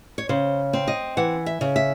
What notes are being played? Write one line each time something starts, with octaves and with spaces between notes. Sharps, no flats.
C#5
C#3 C5
C4
D#5
E3 F#5
E5
C#3
E5